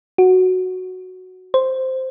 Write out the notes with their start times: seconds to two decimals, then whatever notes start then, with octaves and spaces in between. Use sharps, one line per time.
0.18 F#4
1.54 C5